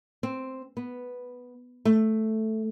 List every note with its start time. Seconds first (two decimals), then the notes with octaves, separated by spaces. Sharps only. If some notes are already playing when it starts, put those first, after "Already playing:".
0.23 C4
0.77 B3
1.85 A3